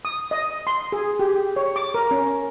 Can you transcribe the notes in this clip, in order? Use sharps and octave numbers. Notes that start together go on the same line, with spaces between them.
D#6
D#5
C6
G#4
G4
C#5
D6
A#4
C#4